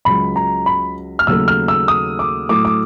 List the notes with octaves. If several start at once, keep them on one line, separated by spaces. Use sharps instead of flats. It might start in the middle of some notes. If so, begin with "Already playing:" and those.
C#2 C#3 F#3 B5
A#5
B5
F6
D#2 C#3 F#3 A3 E6
F6
E6
D#6
D6
A2 F#3 A3 D6
D6